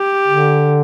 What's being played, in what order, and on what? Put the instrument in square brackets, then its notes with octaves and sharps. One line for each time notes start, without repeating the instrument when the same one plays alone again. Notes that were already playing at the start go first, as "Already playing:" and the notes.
Already playing: [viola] G4
[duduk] D3